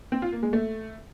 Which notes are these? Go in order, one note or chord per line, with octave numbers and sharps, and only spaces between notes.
C4
F4
A#3
G#3
A3